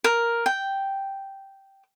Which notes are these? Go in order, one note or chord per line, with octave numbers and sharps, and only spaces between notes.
A#4
G5